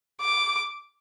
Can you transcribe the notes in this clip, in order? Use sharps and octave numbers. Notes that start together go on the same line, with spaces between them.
D6